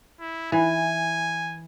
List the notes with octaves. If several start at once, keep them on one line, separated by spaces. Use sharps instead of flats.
E4
E3 G#5